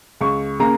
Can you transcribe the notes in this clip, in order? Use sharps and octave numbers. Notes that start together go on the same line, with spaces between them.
C#2 C#6
C#3 A#3 C#4 A#5